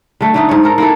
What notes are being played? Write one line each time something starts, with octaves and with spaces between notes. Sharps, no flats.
D3 A3
D3 A3 D#4
G#2 C#5
A4 A#4
A#3 E4 A4